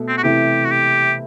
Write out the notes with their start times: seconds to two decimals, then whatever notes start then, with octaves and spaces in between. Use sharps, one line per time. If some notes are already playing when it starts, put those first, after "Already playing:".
Already playing: B2 A3 A4
0.08 C4
0.18 F#4
0.24 C3 E3 A3 E4 G4
0.65 F#4
0.71 G4